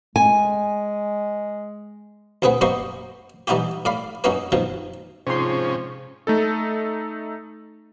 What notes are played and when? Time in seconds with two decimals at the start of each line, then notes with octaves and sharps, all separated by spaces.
0.16 G#3 G#5
2.42 D2 C4 G#4 B4 F#5
2.61 F#2 A#3 B3 C5 D#5 C#6
3.47 E3 G3 D#4 E4 F#4 G4
3.85 A2 D5 F5 B5
4.24 F#2 C#4 D#4 E4 F#4 B4
4.52 F#2 B2 D#3 F3
5.27 G#2 C3 F3 C#4 C5 C6
6.27 A3 D#4 A4